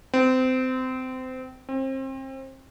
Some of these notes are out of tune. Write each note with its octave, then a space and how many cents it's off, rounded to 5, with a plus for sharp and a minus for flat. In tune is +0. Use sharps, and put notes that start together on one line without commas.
C4 -25
C4 +30